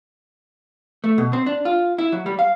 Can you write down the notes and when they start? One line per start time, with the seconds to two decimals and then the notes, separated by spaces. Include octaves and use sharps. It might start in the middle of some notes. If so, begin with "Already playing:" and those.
1.04 A3
1.18 B2
1.33 C4
1.46 D4
1.65 F4
1.98 E4
2.12 F#3
2.26 G3
2.39 F5